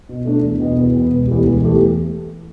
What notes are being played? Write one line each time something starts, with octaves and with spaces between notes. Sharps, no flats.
B2
A3 D4
E2
B2 B3
E2
B2 B3
E1
E2 E3 A3 G4
E1
E2 E3 A3 G4